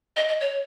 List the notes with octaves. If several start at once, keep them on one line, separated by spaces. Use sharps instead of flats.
D#5
D#5
C#5